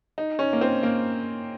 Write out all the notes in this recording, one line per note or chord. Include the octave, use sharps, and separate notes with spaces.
D#4
C#4
A#3
C4
A#3